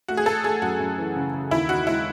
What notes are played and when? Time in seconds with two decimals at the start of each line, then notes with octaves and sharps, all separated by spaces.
0.08 A3 F#4
0.17 G#4
0.26 A3 A4
0.44 A3 G#4
0.62 F#2 F#4
0.80 F#2
0.98 E3
1.16 C#3
1.34 C#3
1.51 D#2 E4
1.69 D#4 F#4
1.87 G#3 E4